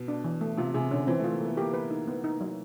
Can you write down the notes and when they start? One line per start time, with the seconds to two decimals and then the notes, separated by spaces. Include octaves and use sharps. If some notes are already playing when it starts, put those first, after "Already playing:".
Already playing: B2
0.08 D4
0.24 E3
0.41 A3
0.58 C3 F4
0.74 C3 G#4
0.91 D3 C#4
1.07 E3 C4
1.19 A3
1.24 F4
1.32 A#3
1.41 A3 B3
1.57 A#3 G4
1.74 B4
1.90 D#4
2.08 B3
2.24 D#4
2.41 F#3